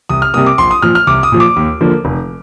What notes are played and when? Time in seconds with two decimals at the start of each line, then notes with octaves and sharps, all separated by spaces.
0.09 C2 D#6
0.22 F6
0.34 C3 G3 A#3 D#6
0.46 D6
0.58 A#1 C6
0.71 D#6
0.82 A#2 F3 F6
0.95 F6
1.07 C2 D6
1.23 D#6
1.32 A#2 F3
1.40 D6
1.56 D#2
1.80 D3 F3 A#3
2.05 F1